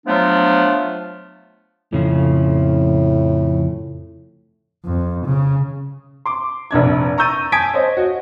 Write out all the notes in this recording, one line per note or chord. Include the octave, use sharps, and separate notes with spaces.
F3 F#3 A3 B3 D4 F4
F2 A2 C#3 F3
F2
C#3
C6 D6
F1 A#1 D4 G#6
A#5 C#6 E6 G6 A6 D#7
G#5 A5 D#6 G#6 B6 D7
C5 C#5 D#5
F#4 D#5